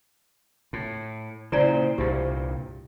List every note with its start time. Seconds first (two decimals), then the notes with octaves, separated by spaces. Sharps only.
0.73 A2
1.52 A#2 C#3 E4 C5 D5
1.98 C2 G2 A#2 G4